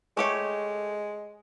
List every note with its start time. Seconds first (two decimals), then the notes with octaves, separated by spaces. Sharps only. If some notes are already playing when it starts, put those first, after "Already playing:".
0.17 G#3 A3 G4 C#5